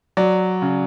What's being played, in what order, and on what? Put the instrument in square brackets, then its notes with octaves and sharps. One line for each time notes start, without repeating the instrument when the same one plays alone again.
[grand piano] F#3 D5
C#3